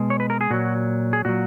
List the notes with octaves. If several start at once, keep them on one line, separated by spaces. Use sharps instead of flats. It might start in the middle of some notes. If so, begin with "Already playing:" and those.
Already playing: B2 G#3
C#5
B4
A#4
G#4
A#2 F#3 F#4
G#4
A#2 F#3 F#4